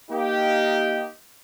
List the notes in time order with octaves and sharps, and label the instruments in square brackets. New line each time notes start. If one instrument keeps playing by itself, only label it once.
[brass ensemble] A#3 D#4 G4